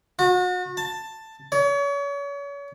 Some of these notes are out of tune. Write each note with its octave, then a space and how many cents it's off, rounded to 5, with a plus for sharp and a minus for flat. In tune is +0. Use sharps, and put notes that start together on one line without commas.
F#4 -35
A5 +10
C#5 +35